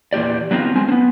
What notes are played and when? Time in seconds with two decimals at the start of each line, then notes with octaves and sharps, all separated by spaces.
0.13 E2 A#2 G4 D5
0.51 F#3 B3 C4 D#4 F4
0.75 G#3 C4 G#5
0.89 B3 C4